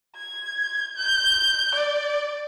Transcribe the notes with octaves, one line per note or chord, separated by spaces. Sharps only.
G#6
G6
D5